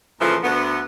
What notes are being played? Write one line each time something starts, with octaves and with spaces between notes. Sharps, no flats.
A#2 C#3 E3 F3 A3
D2 B3